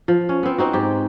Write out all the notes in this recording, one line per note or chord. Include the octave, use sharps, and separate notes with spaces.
F3
C#4
B3 C4
C4 D#4 F#4
G#2 G4